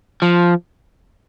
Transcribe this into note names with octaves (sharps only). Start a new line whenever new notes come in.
F3